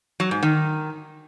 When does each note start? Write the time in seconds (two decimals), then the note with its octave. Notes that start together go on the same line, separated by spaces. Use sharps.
0.20 F#3
0.31 G#2
0.43 D#3